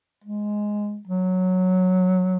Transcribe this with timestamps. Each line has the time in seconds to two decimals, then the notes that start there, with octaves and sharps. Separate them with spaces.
0.24 G#3
1.07 F#3